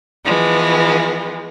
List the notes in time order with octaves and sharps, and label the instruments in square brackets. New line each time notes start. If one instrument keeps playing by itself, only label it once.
[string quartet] E3 F3 G#3 B3